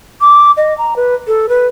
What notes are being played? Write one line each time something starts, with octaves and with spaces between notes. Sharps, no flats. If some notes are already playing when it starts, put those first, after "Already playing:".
D6
D#5
A#5
B4
A4
B4